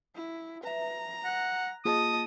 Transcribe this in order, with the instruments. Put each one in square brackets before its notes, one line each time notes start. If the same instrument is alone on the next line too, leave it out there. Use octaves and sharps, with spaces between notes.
[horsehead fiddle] E4
[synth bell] B4 E5 [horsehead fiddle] A#5
[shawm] F#5 [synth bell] F#6 A#6
[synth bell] A#3 F4 G#4 [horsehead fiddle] D#5 A5 [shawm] D#6